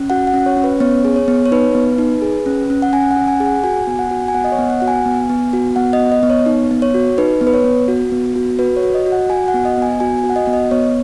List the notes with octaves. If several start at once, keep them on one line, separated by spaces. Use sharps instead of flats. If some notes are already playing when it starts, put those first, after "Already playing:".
Already playing: C#4
F#4 F#5
F#5
C#4
C#5
C#4
B4
B3 C#5
G#4
C#5
B3
C#5
D#4 B4
B3
D#4
G#4
C#4
C#4
F#5
C#4 G#5
F#5
C#4
G#5
G#4
F#5
F#4 G#5
B3 G#5
F#5
F#4
G#5
B3 F#5
D#5
C#5
B3
F#5
F#4 F#5
G#5
B3
B3
F#4
B3 F#5
D#5
B3
D#5
B3
C#5
D#4
B3
C#5
F#4
D#4 B4
B3
B4
C#5
B3
F#4
B3
F#4
F#4 B4
C#5
F#4
D#5
F#4
F#5
F#4 G#5
F#5
B3
D#5
B3 G#5
F#4 G#5
F#4 G#5
F#5
D#5
B3
D#5
B3 C#5